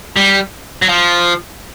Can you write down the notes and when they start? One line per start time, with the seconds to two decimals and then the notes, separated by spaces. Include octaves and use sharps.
0.16 G3
0.82 F#3
0.89 F3